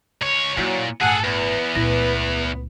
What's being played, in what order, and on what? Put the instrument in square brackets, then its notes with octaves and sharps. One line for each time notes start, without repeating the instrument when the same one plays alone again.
[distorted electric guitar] C#2 C#5
[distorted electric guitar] A#2 [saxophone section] F#3 [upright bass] A#3 E4
[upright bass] G1 A2 [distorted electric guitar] G#4 A4 [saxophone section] F#5 [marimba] G#5 A5
[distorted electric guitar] E2 [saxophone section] B3 B4
[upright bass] C#2 A3 [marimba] A#2 E4 A#6